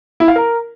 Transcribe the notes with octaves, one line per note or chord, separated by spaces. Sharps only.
E4
F5
A#4